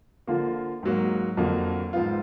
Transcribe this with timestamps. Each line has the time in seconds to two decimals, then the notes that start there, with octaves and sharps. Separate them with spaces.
0.27 D3 F3 A#3 F4
0.83 G#2 F#3 A#3
1.37 F2 D3 F#3 A#3
1.93 G#2 F3 B3 F4